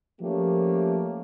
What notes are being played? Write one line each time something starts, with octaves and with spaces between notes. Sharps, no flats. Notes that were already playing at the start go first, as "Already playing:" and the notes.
F3 A3 A#3 C#4 G4